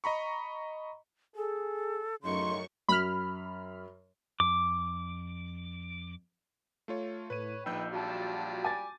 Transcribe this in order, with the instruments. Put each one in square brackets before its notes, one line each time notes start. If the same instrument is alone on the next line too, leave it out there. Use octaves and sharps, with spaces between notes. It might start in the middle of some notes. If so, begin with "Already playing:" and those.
[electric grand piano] D#5 A#5 B5 C#6
[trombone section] G#4 [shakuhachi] A4
[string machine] F#2 C#6 [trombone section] A2 C#3 D#4 [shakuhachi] C6
[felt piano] F#2 [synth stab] B5 F6
[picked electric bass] F2 [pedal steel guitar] D6
[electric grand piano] A3 F4 C#5
[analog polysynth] A2 [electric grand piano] B4 D#7 [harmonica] C#5
[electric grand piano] A#1 E6 G6 [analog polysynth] F3 D#4 [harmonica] B4 G5
[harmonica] F#3 G3 F4 [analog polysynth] F#4 A5
[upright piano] G#5 D6 A6